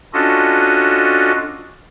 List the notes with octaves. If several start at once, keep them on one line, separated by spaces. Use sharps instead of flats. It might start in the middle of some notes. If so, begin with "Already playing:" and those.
C#4 D4 F4 F#4 A4 D#5